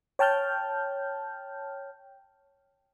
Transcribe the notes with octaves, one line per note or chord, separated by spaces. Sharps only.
C#5 G5 A5 F6 G6